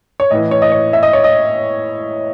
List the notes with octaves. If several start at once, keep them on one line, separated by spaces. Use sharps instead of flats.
C#5
A2 E3 D#5
C#5
D#5
C#5
E5
D#5
C#5
D#5